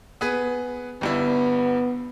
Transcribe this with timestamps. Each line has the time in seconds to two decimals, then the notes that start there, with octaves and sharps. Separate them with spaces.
0.21 B3 G#4 B4
1.01 G1 G2 B3 E4